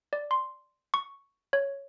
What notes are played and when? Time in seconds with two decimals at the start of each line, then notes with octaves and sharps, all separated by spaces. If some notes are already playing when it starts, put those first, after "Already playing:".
0.13 D5
0.31 C6
0.94 C#6
1.53 C#5